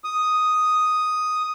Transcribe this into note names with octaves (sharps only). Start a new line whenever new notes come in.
D#6